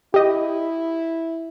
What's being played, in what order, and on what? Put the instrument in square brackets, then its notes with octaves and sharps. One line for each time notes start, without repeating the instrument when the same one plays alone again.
[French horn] E4 [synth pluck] G4 D#5